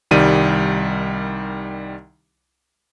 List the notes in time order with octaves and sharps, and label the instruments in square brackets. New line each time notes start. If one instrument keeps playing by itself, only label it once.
[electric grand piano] C2 D#3 G3 D#7